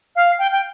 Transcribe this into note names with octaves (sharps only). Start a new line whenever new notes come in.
F5
G5
G5